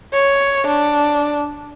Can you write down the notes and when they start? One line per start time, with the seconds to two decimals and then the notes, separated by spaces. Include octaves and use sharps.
0.13 C#5
0.67 D4